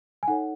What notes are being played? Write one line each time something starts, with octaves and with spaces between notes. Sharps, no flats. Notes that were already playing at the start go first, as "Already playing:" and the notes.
G#5
D#4 A4 C#5 F#5